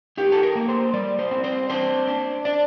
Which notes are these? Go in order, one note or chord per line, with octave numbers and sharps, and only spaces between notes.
D#4 G4
A4
A#4
A#3
C5
G3 D5
C5
C4
C5
D4 C5
D4
D4 D5